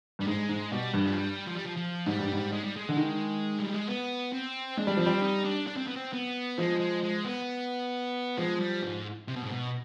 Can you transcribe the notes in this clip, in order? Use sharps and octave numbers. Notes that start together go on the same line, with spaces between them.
G2 G3
G#2 G#3
G#2
B2 G3
G2
F3
G3
F3
G3
F3
F3
G#2 G3
G2
G#2
G#3
G3
G#3
D3
D#3
G3
G#3
B3
C4
G#3 D4
G3
F3 C4
G3
D#4
D4
D4
C4
B3
C4
B3
F3 G#3
G#3
G#3
B3
F3 G#3
G3
G#2
C3
B2
G#2
B2